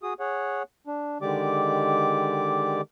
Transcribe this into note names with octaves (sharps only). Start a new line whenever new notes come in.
F#4 G#4 D#6
G#4 C#5 F#5
D4
D3 D#3 G#3 G4 D5 D6